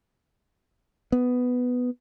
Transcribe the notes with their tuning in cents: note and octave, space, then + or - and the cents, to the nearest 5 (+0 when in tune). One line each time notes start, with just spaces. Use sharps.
B3 +5